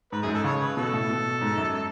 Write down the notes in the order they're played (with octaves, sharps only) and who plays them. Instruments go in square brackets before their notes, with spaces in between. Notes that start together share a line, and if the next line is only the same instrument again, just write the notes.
[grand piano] G#2 [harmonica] B4
[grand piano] F#2 [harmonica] G#4
[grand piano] G#2
[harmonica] A4
[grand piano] C#3 [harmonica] C#5
[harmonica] B4
[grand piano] B2 [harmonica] A4
[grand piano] A2
B2
G#2
F#2